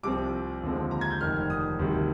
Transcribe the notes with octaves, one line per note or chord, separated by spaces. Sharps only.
C2 C3 F3 C4 D6
D#2 D3 F3 G#3 C4
A#5
G#6
G6
F1 F2 D#3 F6
D#6
D2 C3 D#3 G3